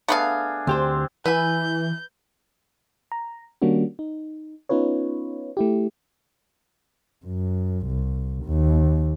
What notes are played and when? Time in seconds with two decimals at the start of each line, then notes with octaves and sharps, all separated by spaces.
0.08 A3 B3 D4 G#4 F5
0.67 D2 C4 G4 C5
1.26 E3 B4 G#5 B5 E6 G6
3.12 A#5
3.62 D#3 G3 A#3 C#4 D4 F#4
3.99 D#4
4.69 B3 C#4 D#4 F4 B4 C#5
5.57 A3 E4 G4
7.25 F#2
7.87 C2
8.45 D#2